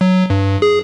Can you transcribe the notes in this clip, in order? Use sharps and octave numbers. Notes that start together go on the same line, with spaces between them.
F#3
G2
G#4